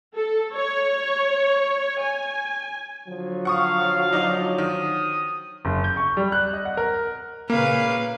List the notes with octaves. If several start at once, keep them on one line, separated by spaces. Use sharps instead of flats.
A4
C#5
G#5
D3 F3 F#3
F5 F#5 C#6 D#6
D#4 D5 D#5
D#3 D#6
F#1
G6
C#6
G3
F#6
D#5
F#5
A#4
A#2 C#3 A#3 B4 F5